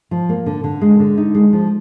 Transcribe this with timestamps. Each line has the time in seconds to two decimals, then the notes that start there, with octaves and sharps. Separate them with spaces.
0.11 F3
0.29 A#3
0.46 D3
0.64 D3
0.81 G#3
0.99 D3
1.18 D#4
1.35 G#3
1.53 F3